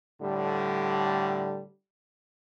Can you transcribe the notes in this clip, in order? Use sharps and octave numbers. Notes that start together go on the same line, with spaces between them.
A2 D3 G3